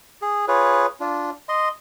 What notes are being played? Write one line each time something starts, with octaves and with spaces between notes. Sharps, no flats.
G#4
F4 G#4 B4 C#5
D4 F4
D#5 C6